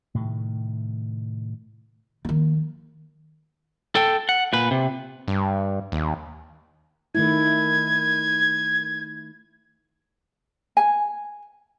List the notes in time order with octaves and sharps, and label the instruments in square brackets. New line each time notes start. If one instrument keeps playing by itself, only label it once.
[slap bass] A2 C3 D#3
[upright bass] D#3 F3 [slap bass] A#3
[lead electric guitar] A4 G5
F#5
A#2 B4
C3
[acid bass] G2
D#2
[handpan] D#3 A3 E4 [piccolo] G#6
[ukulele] G#5